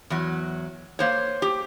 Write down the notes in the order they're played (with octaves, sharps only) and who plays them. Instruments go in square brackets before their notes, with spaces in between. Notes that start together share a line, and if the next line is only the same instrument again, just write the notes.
[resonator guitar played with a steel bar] E2 F#3
A#3 C5 C#5
G4